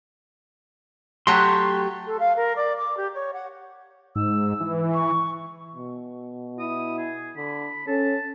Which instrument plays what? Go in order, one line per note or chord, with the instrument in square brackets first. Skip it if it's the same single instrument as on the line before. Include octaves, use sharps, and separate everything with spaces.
[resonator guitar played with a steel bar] F#3 A3 G4 [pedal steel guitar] C6
[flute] A4
F5
A#4
D5
D6
G4
C#5
F#5
[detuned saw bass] G#2 [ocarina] E6
[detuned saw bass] E3
[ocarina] C#6
[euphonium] B2
[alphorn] E4 [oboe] D#6
[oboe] G#4
[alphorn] D3 [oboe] B5
[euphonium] C#4 [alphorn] A4 [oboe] A5